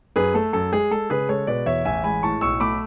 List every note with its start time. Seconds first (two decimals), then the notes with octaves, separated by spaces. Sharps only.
0.16 F#2 G#4 B4
0.34 A3 A4
0.53 F#2 A4
0.72 G#3 G#4
0.91 G#3 A4
1.10 C#3 G#4 B4
1.29 G#3 A4 C#5
1.47 B2 B4 D5
1.66 E2 C#5 E5
1.85 A1 E5 G#5
2.04 G#3 G#5 B5
2.23 A2 A5 C#6
2.41 B1 C#6 E6
2.60 A3 B5 D6